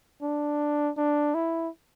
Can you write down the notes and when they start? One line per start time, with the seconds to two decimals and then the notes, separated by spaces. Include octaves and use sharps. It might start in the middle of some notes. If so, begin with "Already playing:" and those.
0.23 D4
0.97 D4
1.35 E4